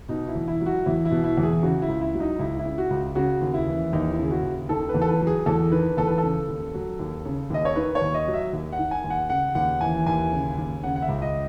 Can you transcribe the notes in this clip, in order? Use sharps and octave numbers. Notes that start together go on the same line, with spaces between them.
B2 D#4
E4
E2
E4
F#3
F#4
E2 E4
E4
B2
E4
E2
G#4
C#3 F#4
E4
C#2
E4
F#3
D#4
C#2 E4
E4
C#3
F#4
C#2
C#3 F#4
D#2
E4
E3
D#2 D#4
E4
C#3
G#4
F#4
D#2
D#3 A4
B4
E2
A4
B4
F#3
G#4
E2 A4
D#3 B4
E2 A4
B4
C#3 A4
D#2
F#3
D#2
C#3
D#2 D#5
C#5
D#3 B4
C#5
D#2
D#5
F#3
E5
D#2 E5
F#5
D#3
G#5
D#2
F#5
C#3 F#5
D#2 F#5
E3 G#5
D#2 G#5
C#3
D#2
C#3 F#5
F#5
E5
C#2
D#5